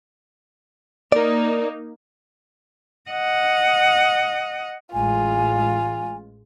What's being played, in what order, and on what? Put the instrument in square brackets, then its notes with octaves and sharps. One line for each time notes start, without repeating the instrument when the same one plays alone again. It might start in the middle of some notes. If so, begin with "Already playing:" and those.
[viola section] A#3 D#4 [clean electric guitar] A#4 D5
[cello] D#5 F#5
[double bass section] A1 G#3 [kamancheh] F4 [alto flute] G#5